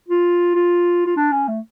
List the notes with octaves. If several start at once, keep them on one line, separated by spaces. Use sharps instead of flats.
F4
F4
F4
D4
C#4
A3